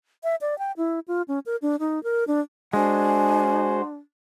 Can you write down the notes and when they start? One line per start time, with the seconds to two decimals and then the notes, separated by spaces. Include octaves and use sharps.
0.24 E5
0.41 D5
0.59 G5
0.77 E4
1.08 F4
1.28 C#4
1.46 A#4
1.62 D4
1.80 D#4
2.04 A#4
2.27 D4
2.73 G#3 D4 F#4 C5 G#5